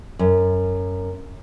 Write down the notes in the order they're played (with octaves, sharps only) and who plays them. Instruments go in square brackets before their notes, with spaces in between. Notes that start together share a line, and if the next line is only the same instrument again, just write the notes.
[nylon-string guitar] F#2